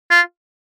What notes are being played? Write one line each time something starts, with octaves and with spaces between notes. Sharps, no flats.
F4